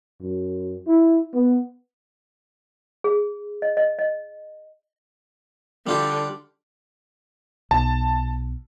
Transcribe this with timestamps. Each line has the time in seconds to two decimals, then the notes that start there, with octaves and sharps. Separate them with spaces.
0.22 F#2
0.88 E4
1.34 B3
3.04 G#4
3.62 D#5
3.77 D#5
3.99 D#5
5.87 D3 G3 F4 G4
7.71 B1 A5